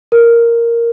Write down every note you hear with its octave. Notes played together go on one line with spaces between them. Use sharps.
A#4